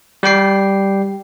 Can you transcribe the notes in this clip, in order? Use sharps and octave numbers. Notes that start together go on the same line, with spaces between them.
G3 G4 G5 C7